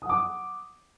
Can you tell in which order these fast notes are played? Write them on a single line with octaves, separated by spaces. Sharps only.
D#6 F#5 D6